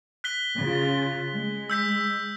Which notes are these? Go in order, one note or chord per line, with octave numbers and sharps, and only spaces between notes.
F#6 B6 G7
C#3 F4
G#3
E6 G6 B6